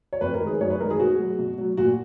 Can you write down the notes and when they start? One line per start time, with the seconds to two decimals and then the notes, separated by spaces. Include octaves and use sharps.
0.13 C#5
0.21 F2 B4
0.34 A#4
0.41 D#3 G#3
0.46 G#4
0.60 F#2 C#5
0.70 B4
0.80 D#3 G#3 A#4
0.90 G#4
0.99 B2 F#4
1.19 F#3
1.39 B2
1.58 F#3
1.77 A#2 F#4